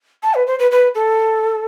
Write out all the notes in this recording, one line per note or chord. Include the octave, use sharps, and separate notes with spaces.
A5
B4
C5
B4
B4
A4